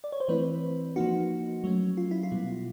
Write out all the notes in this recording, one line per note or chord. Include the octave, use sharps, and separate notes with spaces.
D5
C#5
C5
E3 A3 C4 E4 B4
F3 A#3 D#4 F#4
F#3 A3 C#4
F4
E4
F4
B2 G3 B3